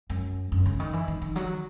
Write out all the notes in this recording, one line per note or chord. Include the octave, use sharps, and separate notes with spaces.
F#2
F#2
C#3
D#3
E3
D#3
D#3
F#3